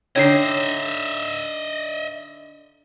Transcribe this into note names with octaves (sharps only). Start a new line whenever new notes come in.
D3 D#4 C#5 D#5 E5 G5 C7